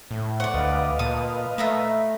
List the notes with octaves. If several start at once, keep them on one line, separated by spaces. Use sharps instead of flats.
A2
C5 D5 F#5 C#6
D2 B4 D#5 F5
A#2 A5 D#6
A3 E5 A#5 B5